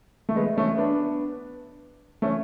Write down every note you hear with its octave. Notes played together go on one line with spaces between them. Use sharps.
A3
G#3 B3
A3 C#4
B3 D4
A3 C#4